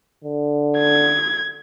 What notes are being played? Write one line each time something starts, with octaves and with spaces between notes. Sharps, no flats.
D3
G#6